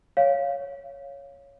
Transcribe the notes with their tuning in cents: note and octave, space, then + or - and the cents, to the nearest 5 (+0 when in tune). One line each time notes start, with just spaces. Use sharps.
C#5 +5 F5 +0